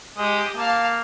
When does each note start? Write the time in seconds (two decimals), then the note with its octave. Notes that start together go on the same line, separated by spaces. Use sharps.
0.17 G#3 G4 D#5
0.56 A#3 F5 A5